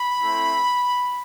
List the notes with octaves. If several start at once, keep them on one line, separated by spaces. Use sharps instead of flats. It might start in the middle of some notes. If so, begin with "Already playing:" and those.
Already playing: B5
A3 C4 E4